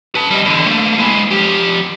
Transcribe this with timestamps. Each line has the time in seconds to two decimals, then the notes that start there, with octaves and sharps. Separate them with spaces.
0.15 B4 A5
0.31 G3 D#5
0.45 E2 D3
0.66 A3 A#3
0.98 G#3 E4
1.31 F3 G4